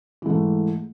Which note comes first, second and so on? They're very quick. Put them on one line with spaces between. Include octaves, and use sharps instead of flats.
E3 G#2 A3